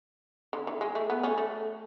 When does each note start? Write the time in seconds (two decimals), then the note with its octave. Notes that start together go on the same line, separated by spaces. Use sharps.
0.53 D3
0.67 E3
0.81 G#3
0.95 A3
1.10 B3
1.23 A3 C#4
1.38 A3